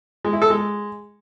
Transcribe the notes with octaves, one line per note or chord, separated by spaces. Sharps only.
G#3
E4
A4
G#3